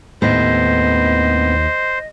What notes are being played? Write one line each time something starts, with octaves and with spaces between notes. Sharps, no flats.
D#2 A2 B3 C4 C5 D#5